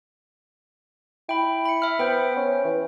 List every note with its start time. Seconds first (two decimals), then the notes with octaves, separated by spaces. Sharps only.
1.29 E4 G5 B5
1.65 B5 C#7
1.82 E5 F6
1.99 B3 C5 G5
2.37 C#4
2.65 E3